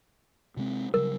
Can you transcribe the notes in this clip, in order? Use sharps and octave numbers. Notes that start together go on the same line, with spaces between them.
C3 G#3 C4
C#3 F#3 G3 A#4